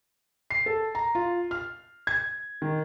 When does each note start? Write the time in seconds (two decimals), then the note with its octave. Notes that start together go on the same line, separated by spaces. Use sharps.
0.50 C7
0.66 A4
0.95 A#5
1.15 F4
1.51 F6
2.07 G#6
2.62 D#3